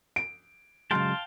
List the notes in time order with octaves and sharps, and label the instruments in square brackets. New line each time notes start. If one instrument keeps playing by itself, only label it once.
[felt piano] D7
[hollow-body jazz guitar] C#3 F#3 G#3 [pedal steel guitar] F5 G5 A5 [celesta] C6